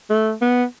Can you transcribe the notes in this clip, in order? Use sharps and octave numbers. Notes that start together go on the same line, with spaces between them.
A3
B3